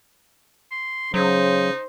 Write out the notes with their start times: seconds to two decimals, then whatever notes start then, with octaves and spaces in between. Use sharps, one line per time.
0.71 C6
1.14 C#3 F#3 D#4 C5